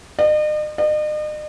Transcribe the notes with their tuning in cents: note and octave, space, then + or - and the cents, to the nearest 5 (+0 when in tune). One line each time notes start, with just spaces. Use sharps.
D#5 -40
D#5 -40